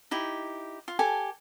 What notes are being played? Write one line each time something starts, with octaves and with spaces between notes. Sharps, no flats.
D#4 E4 G4
F4
G4 A4 G#5